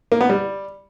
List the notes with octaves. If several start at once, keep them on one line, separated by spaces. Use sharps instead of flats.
A#3
B3
G3